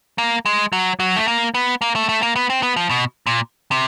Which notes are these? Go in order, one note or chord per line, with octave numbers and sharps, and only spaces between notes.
A#3
G#3
F#3
F#3
A3
A#3
B3
A#3
A3
A3
A#3
B3
C4
B3
F3
B2
A#2
C3